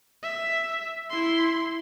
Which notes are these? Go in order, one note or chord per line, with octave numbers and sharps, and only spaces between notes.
E5
E4 C6